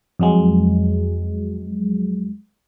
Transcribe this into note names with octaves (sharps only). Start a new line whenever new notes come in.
F2 F#3 G#3